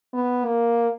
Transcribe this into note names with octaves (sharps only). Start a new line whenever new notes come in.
B3
A#3